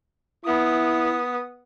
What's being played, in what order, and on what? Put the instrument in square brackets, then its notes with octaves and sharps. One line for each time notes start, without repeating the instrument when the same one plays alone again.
[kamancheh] B3 D#6 [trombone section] E4